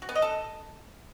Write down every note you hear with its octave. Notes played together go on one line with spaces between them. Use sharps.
F#4
B3
D#5
A4